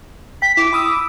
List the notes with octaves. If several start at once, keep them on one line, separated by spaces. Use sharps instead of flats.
G5 B6
E4 D6
B5 D#6 E6